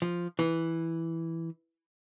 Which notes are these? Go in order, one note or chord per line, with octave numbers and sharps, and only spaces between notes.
F3
E3